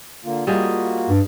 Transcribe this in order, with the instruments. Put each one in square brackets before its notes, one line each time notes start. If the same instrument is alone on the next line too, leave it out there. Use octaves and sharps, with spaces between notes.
[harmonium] D3 A#3 F4
[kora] G3 G#4 D#5 [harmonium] A#3 F4 F#4
[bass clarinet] G2